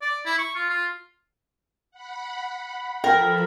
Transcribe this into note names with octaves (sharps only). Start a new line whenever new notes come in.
D5
E4
C#6
F4
F4
F#5 B5
F3 A4 A#4 G5 B5